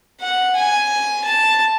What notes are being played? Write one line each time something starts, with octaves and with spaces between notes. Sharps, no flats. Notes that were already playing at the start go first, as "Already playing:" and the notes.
F#5
G#5
A5